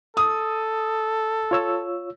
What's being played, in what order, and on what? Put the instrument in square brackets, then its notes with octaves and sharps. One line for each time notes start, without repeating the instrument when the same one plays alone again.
[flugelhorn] A4 [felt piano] D#6
[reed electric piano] F4 C#5 E6